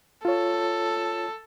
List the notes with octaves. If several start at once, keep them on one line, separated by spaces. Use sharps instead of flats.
F4 A4 C#5